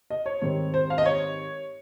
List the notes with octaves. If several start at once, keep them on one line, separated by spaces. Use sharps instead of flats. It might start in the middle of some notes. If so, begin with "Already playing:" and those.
D#5
C#5
G#2 D#3 G3 C4 C#5
C5
F5
D#5
C#5